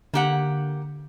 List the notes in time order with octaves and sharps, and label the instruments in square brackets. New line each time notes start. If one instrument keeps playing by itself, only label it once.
[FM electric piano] D3 [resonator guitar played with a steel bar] A#3 G4 F#5